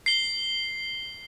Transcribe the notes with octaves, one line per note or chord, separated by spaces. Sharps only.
C7 G7